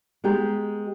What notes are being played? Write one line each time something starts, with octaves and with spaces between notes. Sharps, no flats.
G#3 B3 G4 A#4